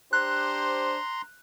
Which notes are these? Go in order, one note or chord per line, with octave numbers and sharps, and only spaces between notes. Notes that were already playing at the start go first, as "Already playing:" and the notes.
D4 G4 C5 A#5 C6 F#6